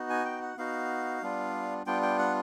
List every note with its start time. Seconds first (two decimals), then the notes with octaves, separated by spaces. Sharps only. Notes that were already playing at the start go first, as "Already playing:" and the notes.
Already playing: B3 D#4 F#4
0.10 G#5
0.25 G5
0.42 F#5
0.57 B3 D#4 F#4 F5
1.23 G3 B3 D4 F4
1.86 G3 B3 D4 F4 G5
2.02 G5
2.19 F#5